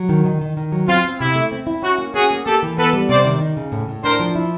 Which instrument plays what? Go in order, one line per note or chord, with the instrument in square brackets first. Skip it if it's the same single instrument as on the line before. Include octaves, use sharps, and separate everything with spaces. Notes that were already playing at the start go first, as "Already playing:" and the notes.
Already playing: [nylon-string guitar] F#3
D#3
D#3
D#3
D#3
F#3
[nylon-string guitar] C4 [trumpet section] F4
[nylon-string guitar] C4
[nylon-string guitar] C3 [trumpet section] E4
[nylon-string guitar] A3
C4
E4
[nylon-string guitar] C#4 [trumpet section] F#4
[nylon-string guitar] A#3
[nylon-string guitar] C#4 [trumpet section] F#4 G#4
[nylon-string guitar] A#3
[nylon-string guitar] A#3 [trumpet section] G4 A4
[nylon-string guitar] E3
[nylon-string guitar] B3 [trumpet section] A4 B4
[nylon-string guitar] G3
[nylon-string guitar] C3 [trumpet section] C5 D5
[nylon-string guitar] D#3
D#4
C#3
A2
A2
[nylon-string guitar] D4 [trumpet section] A#4 C5
[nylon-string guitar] F3
E4